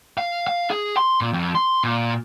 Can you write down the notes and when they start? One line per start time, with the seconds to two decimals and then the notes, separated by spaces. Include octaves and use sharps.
0.18 F5
0.47 F5
0.70 G#4
0.97 C6
1.21 A#2
1.33 F2
1.55 C6
1.84 A#2